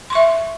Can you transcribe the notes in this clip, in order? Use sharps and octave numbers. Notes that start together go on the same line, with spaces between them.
E5 C6 C#6